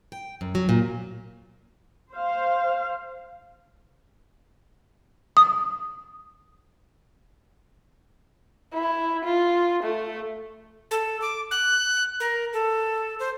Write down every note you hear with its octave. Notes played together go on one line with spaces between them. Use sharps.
G5
F#2
F#3
A#2
C5 F5
D#6
E4
F4
A3
A4
D6
F#6
A#4
A4
C5